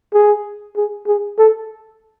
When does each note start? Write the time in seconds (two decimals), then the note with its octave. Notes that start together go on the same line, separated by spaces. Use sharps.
0.14 G#4
0.76 G#4
1.07 G#4
1.38 A4